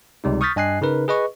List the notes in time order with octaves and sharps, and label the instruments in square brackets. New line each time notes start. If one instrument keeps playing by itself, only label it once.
[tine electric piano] C#2 C3 G3 D#4
C#6 D#6 F6 G6 A6 B6
G2 D#5 G#5 F#6 C7
C#3 D#4 A#4 B4
G#4 B4 D#5 C#6